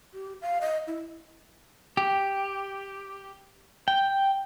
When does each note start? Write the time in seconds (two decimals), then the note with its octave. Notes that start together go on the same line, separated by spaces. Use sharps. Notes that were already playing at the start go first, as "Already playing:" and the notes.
0.13 G4
0.42 F5
0.61 D#5
0.87 E4
1.97 G4
3.88 G5